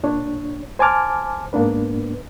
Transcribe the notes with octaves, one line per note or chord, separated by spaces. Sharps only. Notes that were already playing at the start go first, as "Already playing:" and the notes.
A#2 D4 C#5
C5 G#5 A5 D6 F6
G#2 A#3 B3 D4 B4